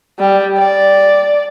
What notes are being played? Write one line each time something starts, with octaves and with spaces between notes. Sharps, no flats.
G3
D5